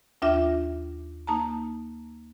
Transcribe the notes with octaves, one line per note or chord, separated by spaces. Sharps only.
D#2 D4 F4 E5 D6 A#6
A#3 D#4 A5 A#5